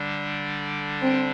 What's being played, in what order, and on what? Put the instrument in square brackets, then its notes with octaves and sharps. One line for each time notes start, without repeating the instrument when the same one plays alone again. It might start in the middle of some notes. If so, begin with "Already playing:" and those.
Already playing: [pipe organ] D3 G3 D4
[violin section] C4